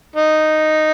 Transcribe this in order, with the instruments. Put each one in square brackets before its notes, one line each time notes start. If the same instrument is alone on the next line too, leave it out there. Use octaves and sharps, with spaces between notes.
[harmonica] D#4